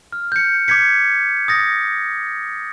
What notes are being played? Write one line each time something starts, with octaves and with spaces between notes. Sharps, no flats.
F6
G6 C#7
D6 G6 G#6 B6 C#7
D#6 A6 A#6